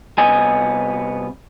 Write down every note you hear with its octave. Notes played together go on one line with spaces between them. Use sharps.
C2 C3 B3 D#5 G#5